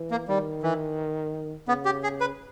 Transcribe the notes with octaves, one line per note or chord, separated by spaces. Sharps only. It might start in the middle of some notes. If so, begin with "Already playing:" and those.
Already playing: E3
A#3
D#3 G3
E3
C#3 B3
G4
G#4
B4